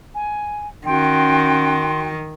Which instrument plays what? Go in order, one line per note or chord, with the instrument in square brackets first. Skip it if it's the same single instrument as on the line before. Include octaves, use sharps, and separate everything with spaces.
[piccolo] G#5
[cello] D#3 [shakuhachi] C#4 [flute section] F#4 G5 [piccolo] C6